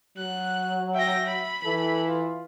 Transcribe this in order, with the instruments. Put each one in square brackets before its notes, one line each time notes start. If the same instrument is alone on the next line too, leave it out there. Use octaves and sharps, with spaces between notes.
[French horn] F#3 [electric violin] F#6
[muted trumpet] E5 [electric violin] G5 A#6
[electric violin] B5
[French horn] E3 [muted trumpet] A4
[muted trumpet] F4